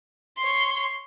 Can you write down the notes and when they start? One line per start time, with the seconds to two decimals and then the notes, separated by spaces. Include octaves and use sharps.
0.38 C#5 C6